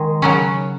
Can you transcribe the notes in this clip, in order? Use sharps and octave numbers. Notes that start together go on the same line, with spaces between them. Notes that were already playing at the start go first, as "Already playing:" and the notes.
Already playing: D#3 G#3
C#3 F#3 C#4